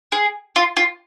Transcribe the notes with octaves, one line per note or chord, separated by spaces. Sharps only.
G#4
F4
F4